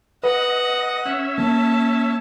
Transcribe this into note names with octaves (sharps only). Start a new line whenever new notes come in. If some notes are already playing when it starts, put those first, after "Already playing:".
B4 D#5 F#5
C#4 E5
A#3 A5